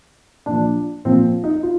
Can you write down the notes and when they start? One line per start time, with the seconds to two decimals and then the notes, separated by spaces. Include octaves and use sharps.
0.46 A#2 F3 D4
1.05 A#2 F3 C4
1.44 D#4
1.63 F4